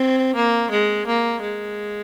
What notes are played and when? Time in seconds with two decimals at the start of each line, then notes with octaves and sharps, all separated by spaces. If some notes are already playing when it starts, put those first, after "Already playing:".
Already playing: C4
0.35 A#3
0.71 G#3
1.07 A#3
1.42 G#3